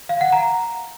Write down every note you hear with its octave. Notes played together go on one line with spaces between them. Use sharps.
F5
F#5
A#5